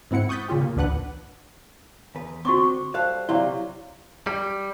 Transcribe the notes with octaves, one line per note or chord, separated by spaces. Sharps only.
G#2 C4 E4 F#5 C#7
C#6 D#6 F#6 G6 A6 B6
A#2 C#3 C#4 F4 G4
A#3
A1 D2 D4 B4 F#5 F#6
E2 B4
D3 C4 F#4 C#6 D6
G3 A4 C5 F5
C3 F#3 E4 D5 F5 C6
G3